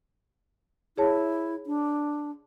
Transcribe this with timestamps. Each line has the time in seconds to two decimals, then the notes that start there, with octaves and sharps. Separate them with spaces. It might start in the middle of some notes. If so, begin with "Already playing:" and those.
0.97 E4 G#4 C#5 A5
1.66 D4